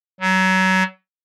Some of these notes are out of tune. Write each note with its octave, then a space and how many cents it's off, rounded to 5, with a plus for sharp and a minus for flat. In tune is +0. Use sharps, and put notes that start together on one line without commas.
F#3 +25